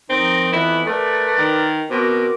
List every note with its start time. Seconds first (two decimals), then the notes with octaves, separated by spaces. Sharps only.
0.10 D#3 F3 C4 D#4
0.53 F2 E3 B3 E4
0.87 A3 A#4 B4 D5
1.38 D#3
1.90 B2 C4 A#4 D6